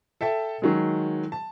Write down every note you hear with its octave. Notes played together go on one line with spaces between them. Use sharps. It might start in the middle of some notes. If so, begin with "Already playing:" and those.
A4 E5 G5 A5
D#3 F#3 G#3
A5